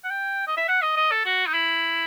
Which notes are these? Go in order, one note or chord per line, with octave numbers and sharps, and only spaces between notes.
F#5
G5
D#5
E5
F#5
D#5
D#5
A4
F#4
D#4
E4